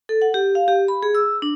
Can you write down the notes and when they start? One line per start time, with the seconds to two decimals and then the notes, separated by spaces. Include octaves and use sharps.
0.09 A4
0.22 F#5
0.34 G4
0.55 F5
0.68 G4
0.88 B5
1.03 G#4
1.15 E6
1.42 D4